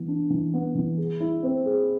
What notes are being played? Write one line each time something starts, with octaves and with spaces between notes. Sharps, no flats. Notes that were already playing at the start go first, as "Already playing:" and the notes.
Already playing: E3 B3
D4
E3
B3
E3
G#4
E4
C4
G#4